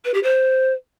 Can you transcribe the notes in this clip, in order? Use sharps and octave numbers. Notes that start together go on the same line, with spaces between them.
B4
G4
C5